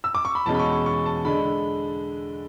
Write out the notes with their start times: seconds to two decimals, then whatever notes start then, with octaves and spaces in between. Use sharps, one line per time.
0.04 E6
0.15 D6
0.25 C#6
0.35 B5
0.46 E2 B2 G#3 C#4 A5
0.54 B5
0.59 C#6
0.72 C#6
0.86 C#6
1.06 A5
1.25 D3 G#3 D4 B5